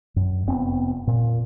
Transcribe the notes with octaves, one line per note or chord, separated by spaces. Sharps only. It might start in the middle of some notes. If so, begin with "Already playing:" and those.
F#2
F1 B3 C4
A#2